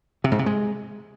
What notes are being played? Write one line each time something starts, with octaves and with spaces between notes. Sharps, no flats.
C3
G#2
C3
G#3